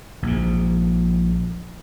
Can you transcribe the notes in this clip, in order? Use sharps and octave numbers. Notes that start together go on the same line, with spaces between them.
A#1 G#2